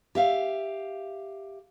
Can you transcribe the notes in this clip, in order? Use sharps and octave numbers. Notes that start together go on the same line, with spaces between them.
G4 E5 F5